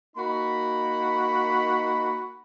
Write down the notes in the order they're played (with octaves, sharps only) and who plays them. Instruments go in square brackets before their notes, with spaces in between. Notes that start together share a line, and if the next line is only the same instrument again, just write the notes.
[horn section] A#3 D#4 F#4 B5